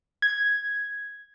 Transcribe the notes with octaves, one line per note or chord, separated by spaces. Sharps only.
G#6